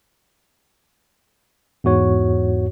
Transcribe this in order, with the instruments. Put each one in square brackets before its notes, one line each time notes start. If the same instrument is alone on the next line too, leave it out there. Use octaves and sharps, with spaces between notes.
[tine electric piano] E2 G#2 F#4 C#5